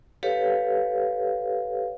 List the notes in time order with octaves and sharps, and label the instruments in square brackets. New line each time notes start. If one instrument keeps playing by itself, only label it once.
[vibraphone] G4 A4 B4 C#5 F5